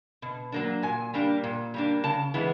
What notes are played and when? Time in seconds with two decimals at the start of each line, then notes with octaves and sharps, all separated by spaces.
0.22 B2
0.52 F#3 A#3 D4
0.83 A#2 G#5
1.14 G3 A#3 D4
1.44 A#2
1.74 G3 A#3 D4
2.04 C#3 A5
2.34 E3 G#3 B3